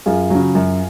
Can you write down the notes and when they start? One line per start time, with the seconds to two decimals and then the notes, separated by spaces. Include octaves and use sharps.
0.06 F#2 F4 G#4
0.30 C#3 F#3
0.55 F#2